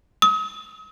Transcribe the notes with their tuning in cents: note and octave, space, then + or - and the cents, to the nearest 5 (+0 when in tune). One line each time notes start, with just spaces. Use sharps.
D#6 +40